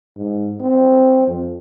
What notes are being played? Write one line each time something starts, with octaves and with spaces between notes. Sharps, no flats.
G#2
C4
F2